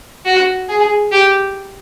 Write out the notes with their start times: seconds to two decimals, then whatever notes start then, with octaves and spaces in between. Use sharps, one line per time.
0.25 F#4
0.69 G#4
1.12 G4